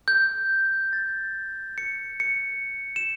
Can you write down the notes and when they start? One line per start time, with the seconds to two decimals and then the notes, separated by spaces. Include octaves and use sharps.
0.08 G6
0.93 A6
1.78 C#7
2.20 C#7
2.96 E7